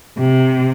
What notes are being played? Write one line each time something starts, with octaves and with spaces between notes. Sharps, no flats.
C3